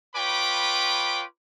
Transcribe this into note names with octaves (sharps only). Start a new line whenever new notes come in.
F4 B4 C#5 G5 B5 D6